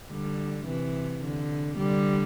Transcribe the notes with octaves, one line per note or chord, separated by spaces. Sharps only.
D3 G3
C3 E3
D3
D3 G3